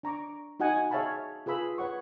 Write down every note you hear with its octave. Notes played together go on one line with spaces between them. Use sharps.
D4 A#5 C#6 D6
D#4 F#4 D#5 F#5 G#5
G#4 C#5 E5 F5 A5 B5
F4 G#4 B4 B5 E6
B4 C#5 F#5 C#6